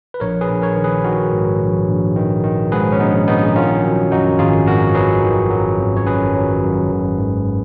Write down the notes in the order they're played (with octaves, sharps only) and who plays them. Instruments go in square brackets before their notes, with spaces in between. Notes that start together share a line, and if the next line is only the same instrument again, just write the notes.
[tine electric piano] B4
A#1 A#4 C#5
G#4 B4
A#1
A#4 C#5
D#3
G#4 B4
D#3 F#4 A#4
G#2
A#1
A#1
D#3
D#3
G#2 G#4 B4
C#4
A#1 B3 D#4
A#1 B3 D#4
D#3 C#4 F4
F#3
F#2 D#4 F#4
G#1 F4 G#4
G#1 F#4 A#4
F#3 G#4 B4
D#3
F#3
G#1
C#5
F#2 G#4 B4
F#3
F#2
G#1
G#2